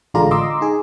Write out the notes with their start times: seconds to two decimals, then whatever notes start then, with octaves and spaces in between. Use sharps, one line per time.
0.14 A1 D3 G#3 F4 D5 A#5
0.31 D#5 A#5 C6 D6 E6
0.61 D#4 G#4